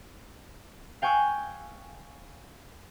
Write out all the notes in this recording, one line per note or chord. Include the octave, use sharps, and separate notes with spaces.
F5 G5 G#5 C#6 E6 F#6